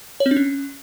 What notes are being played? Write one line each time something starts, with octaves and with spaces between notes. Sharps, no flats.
C#5
C4
D4
C#4